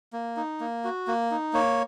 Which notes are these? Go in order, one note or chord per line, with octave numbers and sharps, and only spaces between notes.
A#3
D#4
A#3
F#4
A#3
D#4
A#3 C#5